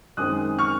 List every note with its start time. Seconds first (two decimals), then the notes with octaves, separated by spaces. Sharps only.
0.17 F#2 D#3 G#3 C4 D#6 F#6
0.59 C#6 F6